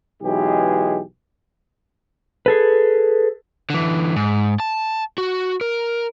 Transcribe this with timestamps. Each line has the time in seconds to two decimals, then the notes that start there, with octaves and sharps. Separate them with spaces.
0.22 B1 E3 G#3 G4 G#4
2.46 G#4 A4 B4
3.70 D3 E3
4.16 G#2
4.60 A5
5.18 F#4
5.61 A#4